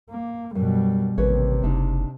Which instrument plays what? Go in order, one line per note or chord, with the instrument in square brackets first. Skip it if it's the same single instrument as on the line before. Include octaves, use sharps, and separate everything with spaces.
[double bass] A#3
[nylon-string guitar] F#2 [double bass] B2 G3
[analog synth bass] A1 [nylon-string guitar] D#2 B4 C#5 [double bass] C3
[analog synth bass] F#1 [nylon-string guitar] D4 D#4